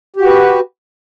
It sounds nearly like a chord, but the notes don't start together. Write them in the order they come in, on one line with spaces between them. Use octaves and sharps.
G4 F#4 B4